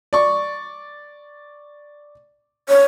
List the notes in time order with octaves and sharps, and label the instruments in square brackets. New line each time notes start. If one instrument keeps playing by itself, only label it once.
[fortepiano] D5 C#6
[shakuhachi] C#5